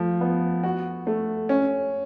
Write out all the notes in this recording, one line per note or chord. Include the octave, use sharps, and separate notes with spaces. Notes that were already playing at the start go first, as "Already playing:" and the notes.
Already playing: F3 A3
B3
F#4
A3
C#4